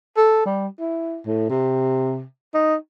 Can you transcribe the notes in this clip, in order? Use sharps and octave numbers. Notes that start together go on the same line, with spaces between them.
A4
G3
E4
A2
C3
D#4